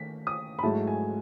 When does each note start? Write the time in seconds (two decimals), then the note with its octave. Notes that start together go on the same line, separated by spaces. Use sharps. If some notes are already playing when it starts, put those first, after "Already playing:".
Already playing: D#3 A3 B6
0.27 D#6
0.59 B5
0.63 G#2 F#3 A3 E4 A5
0.87 G#5